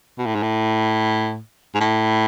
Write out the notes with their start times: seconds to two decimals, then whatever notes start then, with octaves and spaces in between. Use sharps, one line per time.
0.18 B2
0.26 A2
0.35 G#2
0.43 A2
1.75 G#2
1.80 A2